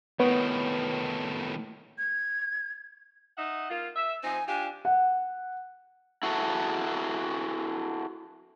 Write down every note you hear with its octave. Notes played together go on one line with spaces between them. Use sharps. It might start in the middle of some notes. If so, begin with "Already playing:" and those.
A2 D#3 B3 B4 C#5
G#6
D#4 E5 F#5
A#3 F4
E5
F3 C4 D#4 G#5
D4 F4 G4 G#5
F#5
E4 F#4 G#4 A4